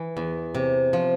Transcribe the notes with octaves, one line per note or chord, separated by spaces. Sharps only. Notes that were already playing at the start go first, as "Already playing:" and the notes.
Already playing: E3
E2
C3
F3